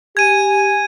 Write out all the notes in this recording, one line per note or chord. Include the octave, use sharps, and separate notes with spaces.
G4 G#5 G#6 D#7